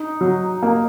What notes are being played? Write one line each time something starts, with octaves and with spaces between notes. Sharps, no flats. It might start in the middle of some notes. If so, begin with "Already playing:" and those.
Already playing: D#4
F#3
A#3